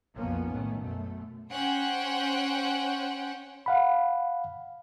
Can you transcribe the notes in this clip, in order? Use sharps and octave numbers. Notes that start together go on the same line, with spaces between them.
B1 F2 F3 A#3 B3 C#4
A2 D#3 A3
F#2 B2 A3
C#4 C5 F#5 G5
F5 F#5 B5